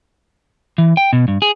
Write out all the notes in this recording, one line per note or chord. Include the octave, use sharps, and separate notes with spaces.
E3
G5
B2
G2
G#4